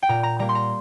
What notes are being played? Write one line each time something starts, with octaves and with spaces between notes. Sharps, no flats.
G5
A#2 A#5
A#5
G3 A#3 A#5
C6
A#5